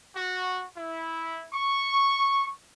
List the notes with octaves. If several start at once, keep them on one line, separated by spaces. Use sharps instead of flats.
F#4
E4
C#6